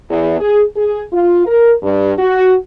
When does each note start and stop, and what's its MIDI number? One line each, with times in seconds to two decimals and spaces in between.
0.10 0.36 40
0.40 0.62 68
0.76 1.03 68
1.13 1.45 65
1.46 1.73 70
1.83 2.13 43
2.19 2.55 66